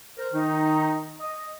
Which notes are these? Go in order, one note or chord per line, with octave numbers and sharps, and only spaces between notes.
A#4 C5
D#3 D#4
D#5